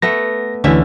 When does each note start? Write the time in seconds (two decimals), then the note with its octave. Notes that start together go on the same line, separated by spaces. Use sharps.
0.02 A3 B3 A#6
0.64 D2 D3 E3 C#4 E5